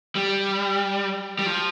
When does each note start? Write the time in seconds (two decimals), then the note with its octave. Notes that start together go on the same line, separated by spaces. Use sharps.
0.15 G3
1.39 G3
1.46 F3